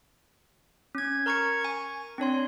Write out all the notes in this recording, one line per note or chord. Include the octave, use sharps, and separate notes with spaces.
C#4 G#6
A#4 A#5 C#6 G#6 C#7
G#5 C#6
C4 D4 C#5 C6